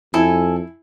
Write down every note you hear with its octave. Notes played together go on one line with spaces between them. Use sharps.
F2 E4 A4 G#5